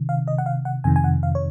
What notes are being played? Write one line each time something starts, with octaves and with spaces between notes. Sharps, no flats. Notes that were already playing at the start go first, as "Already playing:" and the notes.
Already playing: C3 D#3
F5
D#5
F#5
F5
F#5
F2 C3 D#3 G#5
G#5
F#5
F5
C#5